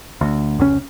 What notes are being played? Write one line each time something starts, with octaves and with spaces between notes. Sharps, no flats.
D2
F1 C#2 A2 C#4